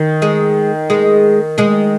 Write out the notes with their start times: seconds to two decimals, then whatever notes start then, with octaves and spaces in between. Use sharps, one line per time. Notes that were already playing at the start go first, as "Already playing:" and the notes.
Already playing: D#3
0.22 G#3 G#4
0.90 G#3 G#4
1.58 G#3 G#4